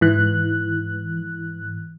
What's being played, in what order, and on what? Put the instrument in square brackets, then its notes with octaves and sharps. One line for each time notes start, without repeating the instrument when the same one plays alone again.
[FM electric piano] G#2 E3 F#6